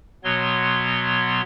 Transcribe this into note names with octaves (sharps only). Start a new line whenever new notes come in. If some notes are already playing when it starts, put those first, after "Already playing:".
B2 F#3 B3 C#5 C6